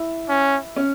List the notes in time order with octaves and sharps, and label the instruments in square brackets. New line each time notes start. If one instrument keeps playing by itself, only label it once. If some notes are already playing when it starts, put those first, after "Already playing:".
Already playing: [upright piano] E4
[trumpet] C#4
[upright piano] C#4